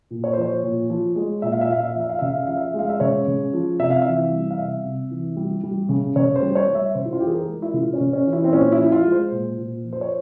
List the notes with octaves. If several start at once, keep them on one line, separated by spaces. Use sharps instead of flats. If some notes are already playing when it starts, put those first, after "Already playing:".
A#2
C#5
C5
F3 C#5
A#2
F3
G#3
A#2 E5
F5
E5
A#2 F5
E5
F5
F3 E5
F5
C#3 E5
F5
E5
F3 F5
E5
G#3
F5
E5
C#3 C#5
C#3
F3
C3 E5
F5
E3 E5
G3
F5
C3 E5
C3
E3
G3
G3
C#3
C#3 C#5
C5
G3
C#5
G3
E5
C#3 C5
E4
F4
E3 G4
G#4
A#4
G#3
E4
C#3 F4
C#4
C#3
C#4
E3
E4
C4
A#2 C#4
E4
F3
F4
G#3
C5
A#2
A#2
F3
C5
C#5